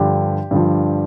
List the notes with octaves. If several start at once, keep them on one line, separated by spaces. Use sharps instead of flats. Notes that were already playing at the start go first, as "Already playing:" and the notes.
Already playing: G2 D3 F3 G4 G5
G2 D3 F3